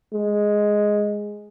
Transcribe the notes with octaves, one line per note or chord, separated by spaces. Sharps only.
G#3